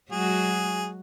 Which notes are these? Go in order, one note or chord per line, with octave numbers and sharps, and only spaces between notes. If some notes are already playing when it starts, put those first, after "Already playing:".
F#3 G#3 F#4 G#4